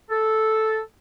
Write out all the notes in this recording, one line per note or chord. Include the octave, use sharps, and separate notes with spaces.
A4